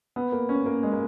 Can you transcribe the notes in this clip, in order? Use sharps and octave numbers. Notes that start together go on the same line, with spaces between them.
B3
A#3
C#4
A#3
G#3
A#3